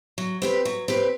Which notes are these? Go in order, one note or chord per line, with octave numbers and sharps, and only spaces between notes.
F#3
C4 G4 B4
F#3
C4 G4 B4